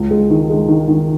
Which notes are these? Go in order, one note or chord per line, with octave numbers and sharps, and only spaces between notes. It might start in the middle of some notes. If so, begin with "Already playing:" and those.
Already playing: C#2
G#3
D#3
G#3
D#3
D#3